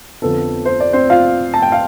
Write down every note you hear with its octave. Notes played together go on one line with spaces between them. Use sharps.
F2 D3 F3 B3 A4
C5
D5
C4 C5
F4 F5
A5
G5
F5